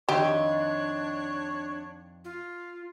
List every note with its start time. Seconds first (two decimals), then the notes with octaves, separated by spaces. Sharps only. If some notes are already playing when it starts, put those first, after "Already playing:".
0.09 F2 D#3 D4 G4 C#5 D#5
2.24 F4